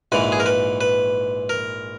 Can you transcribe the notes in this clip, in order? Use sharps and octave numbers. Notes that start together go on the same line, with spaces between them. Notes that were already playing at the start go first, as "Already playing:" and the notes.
A#1 G#2 E3 B4
G#4
A#4
B4
B4
A#4